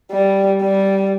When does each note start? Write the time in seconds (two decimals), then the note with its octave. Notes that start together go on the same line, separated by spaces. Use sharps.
0.12 G3
0.62 G3